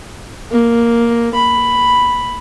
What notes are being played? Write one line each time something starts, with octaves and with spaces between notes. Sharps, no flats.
A#3
B5